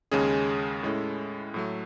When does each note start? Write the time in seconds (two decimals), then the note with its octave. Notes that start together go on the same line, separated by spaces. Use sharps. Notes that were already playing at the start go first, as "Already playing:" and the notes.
0.12 D#2 C#3 G#3 C#4 G#4
0.83 A2 G#3 C#4 E4 A4
1.54 A2 F#3 A3